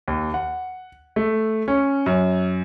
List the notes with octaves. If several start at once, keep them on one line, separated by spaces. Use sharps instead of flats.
D#2
F#5
A3
C#4
F#2